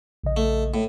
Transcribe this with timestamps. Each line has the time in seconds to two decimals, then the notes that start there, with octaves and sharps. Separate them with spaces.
0.24 A#1 C#3 D#5
0.37 A3
0.74 A2